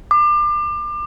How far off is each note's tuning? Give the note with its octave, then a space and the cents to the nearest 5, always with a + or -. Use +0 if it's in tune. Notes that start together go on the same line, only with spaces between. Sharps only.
D6 +30